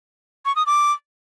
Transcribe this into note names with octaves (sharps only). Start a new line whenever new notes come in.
C#6
D#6
D6